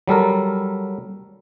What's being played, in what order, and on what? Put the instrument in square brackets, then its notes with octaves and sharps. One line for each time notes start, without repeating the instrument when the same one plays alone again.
[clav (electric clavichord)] F#3 G3 A4 A#4